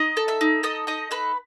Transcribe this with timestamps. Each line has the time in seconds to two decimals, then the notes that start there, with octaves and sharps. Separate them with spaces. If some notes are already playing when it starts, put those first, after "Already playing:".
Already playing: D#4 D#5 D#6
0.17 A4
0.28 E5 E6
0.41 D#4
0.63 A4 D#5 D#6
0.87 D#4 D#5 D#6
1.11 A4 B4 B5